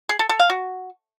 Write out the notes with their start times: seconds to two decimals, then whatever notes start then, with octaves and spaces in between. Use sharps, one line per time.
0.09 G#4
0.19 A4
0.29 A4
0.40 F5
0.50 F#4